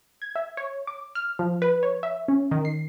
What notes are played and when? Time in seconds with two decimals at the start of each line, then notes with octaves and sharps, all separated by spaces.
0.22 G#6
0.36 E5
0.57 C#5
0.87 D6
1.15 F6
1.39 F3
1.62 B4
1.83 C#5
2.03 E5
2.28 C#4
2.51 D#3
2.65 C7